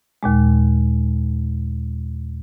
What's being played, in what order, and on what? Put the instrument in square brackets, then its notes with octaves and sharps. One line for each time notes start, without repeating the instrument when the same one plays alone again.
[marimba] D#2 A#2 G#3